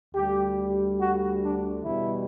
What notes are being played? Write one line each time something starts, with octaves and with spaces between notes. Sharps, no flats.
D2 D3 G3 G4
F#4
D4
E2 B2 G3 E4